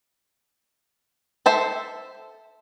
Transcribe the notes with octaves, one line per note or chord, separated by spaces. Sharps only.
A4 C5 E5